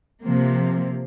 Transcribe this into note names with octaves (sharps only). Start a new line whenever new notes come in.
C3 F3 A#3